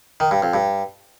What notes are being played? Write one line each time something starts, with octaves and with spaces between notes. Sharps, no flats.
D#3
G2
F2
G2